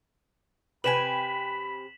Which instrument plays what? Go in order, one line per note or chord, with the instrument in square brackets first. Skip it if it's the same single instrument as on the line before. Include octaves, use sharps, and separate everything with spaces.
[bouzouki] C3 G5 G#5 [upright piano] B4 [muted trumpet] B5 [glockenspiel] B6 E7 F#7